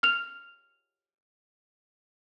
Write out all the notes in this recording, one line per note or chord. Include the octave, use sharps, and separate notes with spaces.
F6 F7